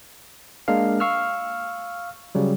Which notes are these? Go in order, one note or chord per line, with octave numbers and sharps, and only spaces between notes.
G#3 A#3 D4 A#4 F5
F5 C#6 E6 F6
C#3 F#3 G3